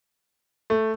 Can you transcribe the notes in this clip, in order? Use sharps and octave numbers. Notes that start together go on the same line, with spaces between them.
A3